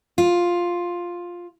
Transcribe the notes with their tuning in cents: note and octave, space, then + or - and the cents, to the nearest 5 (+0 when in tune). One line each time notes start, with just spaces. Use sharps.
F4 +5